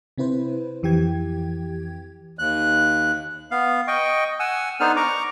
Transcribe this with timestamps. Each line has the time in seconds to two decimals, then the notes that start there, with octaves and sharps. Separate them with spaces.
0.18 C3 C4 E4 B4 C5
0.83 F2 E3 G4 G5 G#6
2.39 D#2 F#6
3.51 B3 F5
3.88 D#5 G5 C#6
4.39 F#5 G#5 E6
4.80 B3 D4 D#4 A4 C5 F6
4.96 A#5 C#6 D6